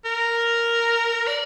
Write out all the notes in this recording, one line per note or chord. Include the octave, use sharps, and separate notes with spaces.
A#4
D5